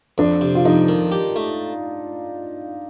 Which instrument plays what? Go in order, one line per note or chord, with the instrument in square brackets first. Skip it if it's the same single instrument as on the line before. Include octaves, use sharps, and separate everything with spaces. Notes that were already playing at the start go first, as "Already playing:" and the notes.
[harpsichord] F2 [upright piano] D4
[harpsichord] C3
[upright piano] F4
[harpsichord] F2 [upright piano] D#4
[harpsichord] D#3
G4
A3